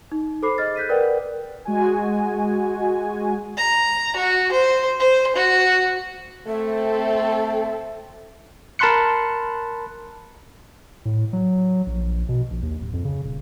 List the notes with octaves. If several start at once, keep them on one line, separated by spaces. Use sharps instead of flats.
D#4
A4 C5 B5 D6 C7
G#4 D#5 F6 A6
F#6 G6 B6 D#7
A#4 B4 D5 F#5 G5
G#3 F#4 G#5
A#5
F#4
C5
C5
F#4
A3 C4 A4 E5
A#4 A5 B5 C6 F#6 C#7
A2
F#3
A#1
B2
A#1
D#2
D1
F2
C#3
D#1